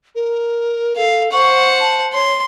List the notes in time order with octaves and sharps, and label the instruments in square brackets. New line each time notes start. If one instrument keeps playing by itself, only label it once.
[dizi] A#4
[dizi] A4 [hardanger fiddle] F5
[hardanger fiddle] C5 F#5 [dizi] C#6
[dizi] A5
[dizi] C#5 [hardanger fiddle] C6